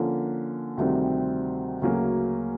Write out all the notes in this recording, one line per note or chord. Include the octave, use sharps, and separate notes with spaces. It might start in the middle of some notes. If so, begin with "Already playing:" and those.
Already playing: D3 F3 A#3 C#4
D2 C3 D#3 G3 C4
D2 C#3 F#3 A#3 C#4